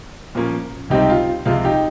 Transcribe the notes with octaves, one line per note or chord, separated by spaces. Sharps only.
A#2 F3 A#3 C#4
C#2 C3 G3 C4 D#4 G4
F4
C#2 C3 F3 G#3 F4
D#4 G4